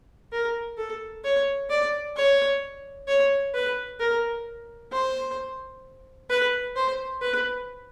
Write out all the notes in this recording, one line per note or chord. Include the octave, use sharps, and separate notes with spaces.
A#4
A4
C#5
D5
C#5
C#5
B4
A#4
C5
B4
C5
B4